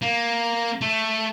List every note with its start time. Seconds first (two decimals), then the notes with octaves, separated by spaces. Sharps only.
0.02 A#3
0.81 A3